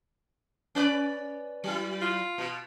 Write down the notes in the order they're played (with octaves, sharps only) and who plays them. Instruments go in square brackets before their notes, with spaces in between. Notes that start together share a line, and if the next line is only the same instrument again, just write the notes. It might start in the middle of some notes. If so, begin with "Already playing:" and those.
[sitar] C#4 B4 D5
F#3 E4
[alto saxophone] F4
[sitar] B2